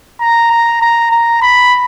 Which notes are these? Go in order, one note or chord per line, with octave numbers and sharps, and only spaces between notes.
A#5
A#5
A#5
A#5
B5